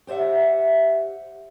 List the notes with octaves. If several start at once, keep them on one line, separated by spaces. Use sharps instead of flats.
G4 C5 D5 E5 F#5